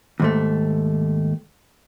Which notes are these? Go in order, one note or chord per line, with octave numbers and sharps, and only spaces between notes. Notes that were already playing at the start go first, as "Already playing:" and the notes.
D#2 G#2 A3